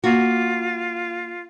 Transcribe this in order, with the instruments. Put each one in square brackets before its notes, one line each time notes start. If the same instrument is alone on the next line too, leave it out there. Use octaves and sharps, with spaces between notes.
[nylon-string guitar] A#3 F#4 [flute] F4